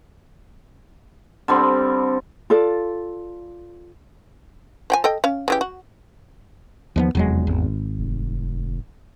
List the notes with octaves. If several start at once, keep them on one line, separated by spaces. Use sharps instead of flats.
D3 G3 C4
F4 A4 D5
F3 G5 G#5
A4 D#5 G5
C#4 F5
C#3 E3 G4
F#4
D#2 F3 G#3 B3
F1 E2 F#3 G#3
G#1
F1